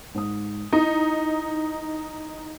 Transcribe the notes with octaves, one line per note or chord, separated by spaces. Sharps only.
G#2 D#6
D#4 E4